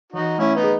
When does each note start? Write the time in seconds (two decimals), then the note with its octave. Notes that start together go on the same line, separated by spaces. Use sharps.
0.12 E3 D#4 F#4
0.38 A3 C#4 E4
0.55 B3 D#4
0.63 G#4